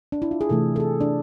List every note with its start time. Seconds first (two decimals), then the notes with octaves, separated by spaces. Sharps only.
0.12 D4
0.22 E4
0.31 F4
0.41 G#4
0.49 C3 E3 A3 A4
0.76 A4
0.80 G#4
1.01 D4